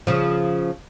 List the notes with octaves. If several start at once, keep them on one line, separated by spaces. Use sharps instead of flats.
C#3 F3